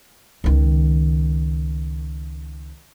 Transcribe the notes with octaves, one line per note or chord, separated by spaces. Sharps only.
C#2 D#3